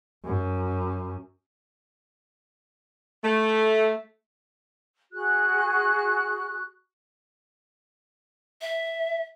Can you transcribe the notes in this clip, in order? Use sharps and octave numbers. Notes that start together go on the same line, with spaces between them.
F#2
A3
F#4 G#4 F#6
E5